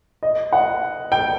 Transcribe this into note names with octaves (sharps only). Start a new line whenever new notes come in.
D#5
F#5
G5